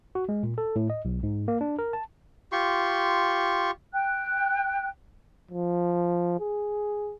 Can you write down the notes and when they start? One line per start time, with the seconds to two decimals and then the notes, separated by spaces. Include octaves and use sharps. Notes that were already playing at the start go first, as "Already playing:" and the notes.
0.15 F#4
0.29 G#3
0.43 A#2
0.58 A4
0.76 A2
0.90 D#5
1.05 B1
1.23 G#2
1.48 A#3
1.61 D4
1.79 A#4
1.93 A5
2.52 F4 G4 C6 C#6
3.93 G5 F#6
5.51 F3
6.40 G#4